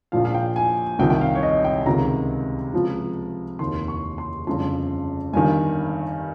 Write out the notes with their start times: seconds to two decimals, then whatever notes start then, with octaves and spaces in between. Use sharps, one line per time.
0.12 A#1 A#2 F3 F5
0.25 F5
0.34 G5
0.56 G#5
0.99 C2 C3 D#3 G5
1.10 G5
1.21 F5
1.35 C#5
1.43 D#5
1.65 G5
1.86 C#2 C3 D#3 A#5
2.74 C#2 C3 F3
3.59 F1 D#2 D#3 C6
3.88 C#6
4.18 C6
4.47 G1 F2 C#3 F3 C6
5.33 G1 G2 D#3 G#5